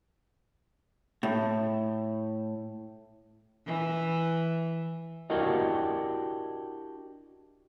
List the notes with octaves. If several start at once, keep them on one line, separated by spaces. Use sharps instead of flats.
A2
E3
D4 E4 F#4 G4 A#4 D#5